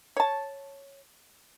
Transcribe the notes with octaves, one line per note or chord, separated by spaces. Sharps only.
C#5 A5